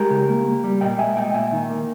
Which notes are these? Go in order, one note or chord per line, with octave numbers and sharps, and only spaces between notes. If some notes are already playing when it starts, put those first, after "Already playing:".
Already playing: G#3 G4 A#4
C#3
A#3
A#3
G3
A#2 D#5 G5
G#3 E5 G#5
A#2 D#5 G5
A#2 E5 G#5
D#3
A#3